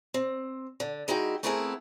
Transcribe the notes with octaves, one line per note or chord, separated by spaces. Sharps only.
C4
D3
G#3 D#4 E4 F#4 G5
A3 B3 C4 E4 G#4 A#4